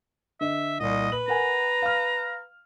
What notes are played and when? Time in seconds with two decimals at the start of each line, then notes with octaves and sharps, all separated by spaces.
0.41 D3 D#5 E5
0.80 C2 A#2 D#5
1.12 B4 F#7
1.28 A#4 F#5 G#5 A#5
1.82 F5 F6